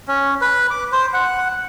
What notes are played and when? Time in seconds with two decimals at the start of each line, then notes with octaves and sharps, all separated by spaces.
0.08 C#4
0.41 B4
0.70 D6
0.92 C5
1.13 F#5